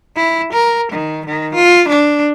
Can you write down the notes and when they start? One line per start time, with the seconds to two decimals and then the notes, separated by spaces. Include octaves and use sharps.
0.16 E4
0.53 A#4
0.92 D#3
1.26 D#3
1.55 F4
1.88 D4